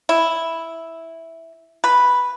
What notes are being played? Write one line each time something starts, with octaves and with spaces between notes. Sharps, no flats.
E4
B4